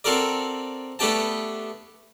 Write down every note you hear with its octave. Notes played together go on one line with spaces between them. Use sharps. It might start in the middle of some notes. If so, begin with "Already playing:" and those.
C4 F#4 A4 A#4 D5
A3 B3 D4 G4 G5 A5